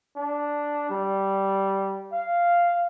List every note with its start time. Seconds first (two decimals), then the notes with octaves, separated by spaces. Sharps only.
0.16 D4
0.90 G3
2.12 F5